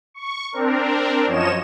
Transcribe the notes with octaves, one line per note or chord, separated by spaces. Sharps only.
C#6
C4 D4 A#4
F#2 F3 C#5 D#5 E7